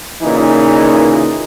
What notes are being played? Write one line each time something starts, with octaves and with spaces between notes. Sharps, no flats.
A#2 C#3 E3 D#4